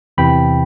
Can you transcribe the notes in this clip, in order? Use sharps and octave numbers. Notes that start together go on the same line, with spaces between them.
E2 C3 E3 G5 B5